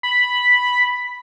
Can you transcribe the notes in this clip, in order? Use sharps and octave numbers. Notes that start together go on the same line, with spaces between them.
B5